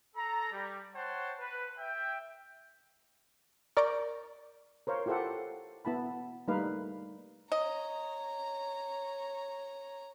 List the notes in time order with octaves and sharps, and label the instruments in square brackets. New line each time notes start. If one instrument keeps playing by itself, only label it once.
[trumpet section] A4 A#5
G3
C5 C#5 F#5 G5 A5
B4
E5 G5
[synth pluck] A#4 D5 A#5 C#6 D6 G6
[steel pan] A#4 C5 C#5 F5
E4 F4 G4 A4 C5 F#5
B3 E4 A5 B5
G3 A3 A#3 D#4 B4 F5
[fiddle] C#5 A#5 [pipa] D#5